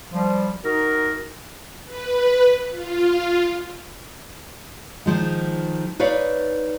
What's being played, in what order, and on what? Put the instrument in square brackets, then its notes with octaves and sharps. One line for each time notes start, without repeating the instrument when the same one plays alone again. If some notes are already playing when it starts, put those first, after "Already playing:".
[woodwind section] F3 G3
D#4 F#4 A#4
[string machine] B4
F4
[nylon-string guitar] D#3 F3 G#3
D#4 B4 C#5 D5 F5